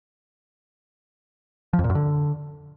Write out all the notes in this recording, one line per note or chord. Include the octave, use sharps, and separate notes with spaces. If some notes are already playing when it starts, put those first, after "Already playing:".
F3
F2
A#2
F#2
D3